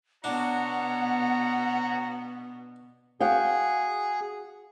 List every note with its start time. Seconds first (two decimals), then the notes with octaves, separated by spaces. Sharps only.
0.24 B2 B3 D4 F#4 C#5 F#5 A#5
3.20 F#4 G#4 F5 G5